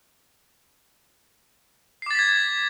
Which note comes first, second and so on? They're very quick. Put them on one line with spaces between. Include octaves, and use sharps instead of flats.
C7 D6 A6 B6 G#6